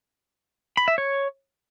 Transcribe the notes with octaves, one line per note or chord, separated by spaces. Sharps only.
B5
E5
C#5